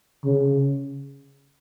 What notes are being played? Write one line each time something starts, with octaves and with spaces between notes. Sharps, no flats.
C#3